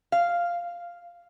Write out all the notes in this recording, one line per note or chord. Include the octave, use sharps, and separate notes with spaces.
F5